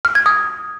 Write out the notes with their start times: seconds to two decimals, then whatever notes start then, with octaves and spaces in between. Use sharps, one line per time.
0.05 F6
0.15 G#6
0.26 D#6